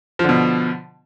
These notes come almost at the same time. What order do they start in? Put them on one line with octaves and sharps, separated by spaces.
F3 D3 B2